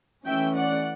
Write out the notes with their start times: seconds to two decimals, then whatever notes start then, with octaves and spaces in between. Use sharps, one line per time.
0.26 E3 A3 C#4 E5 G5
0.56 D5 F#5